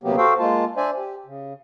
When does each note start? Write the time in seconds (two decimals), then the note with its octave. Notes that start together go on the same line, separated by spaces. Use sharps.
0.03 D2 C3 F#3 A#3 B3 G4
0.17 F#4 A4 C5 F5 G5
0.39 G#3 A#3 F4 A5
0.77 D4 C5 D5 E5 G#5
0.97 G4
1.26 C#3